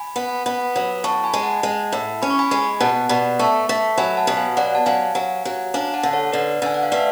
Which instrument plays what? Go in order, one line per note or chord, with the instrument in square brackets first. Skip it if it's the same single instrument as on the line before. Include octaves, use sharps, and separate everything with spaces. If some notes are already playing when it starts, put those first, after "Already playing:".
Already playing: [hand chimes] G#5 B5
[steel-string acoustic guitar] B3
B3
F#3
[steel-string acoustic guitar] A2 [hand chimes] A5 C#6
[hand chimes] G#5 B5
[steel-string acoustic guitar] G#3
[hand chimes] F#5 A5
[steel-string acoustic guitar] G#3
A2
[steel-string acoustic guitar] C#4 [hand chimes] B5
[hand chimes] C#6
G#5 B5
[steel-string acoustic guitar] G#3 [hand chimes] G#5 B5
[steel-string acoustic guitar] B2 [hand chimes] F#5 A5
[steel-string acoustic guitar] B2 [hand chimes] D5 F#5
[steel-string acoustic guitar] A3 [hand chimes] A5 C#6
[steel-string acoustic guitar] A3
[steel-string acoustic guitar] F#3 [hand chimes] G#5 B5
[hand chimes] F#5 A5
[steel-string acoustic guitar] B2
[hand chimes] F5 G#5
[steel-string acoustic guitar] F#3 [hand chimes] D5 F#5
[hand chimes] A5
[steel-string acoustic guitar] F#3 [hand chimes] F5 G#5
[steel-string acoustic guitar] F#3
F#3
[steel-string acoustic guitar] D4 [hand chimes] F5 G#5
[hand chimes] F#5 A5
[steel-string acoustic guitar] D3
[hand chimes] A4 C#5
[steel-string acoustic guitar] D3 [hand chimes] B4 D5
[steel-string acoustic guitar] D3 [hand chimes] G#5
[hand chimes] F#5
F5
[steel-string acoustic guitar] A3 [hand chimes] B4 D5